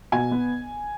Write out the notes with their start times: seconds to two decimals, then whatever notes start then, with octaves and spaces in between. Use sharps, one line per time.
0.12 B2 G#5
0.31 B3